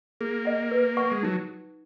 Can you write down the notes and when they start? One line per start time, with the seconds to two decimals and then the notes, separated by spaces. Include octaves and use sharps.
0.21 A#3 G#4
0.45 D#5 F#5
0.72 B4
0.97 F#5 C#6
1.12 G#3
1.23 F#3 D#4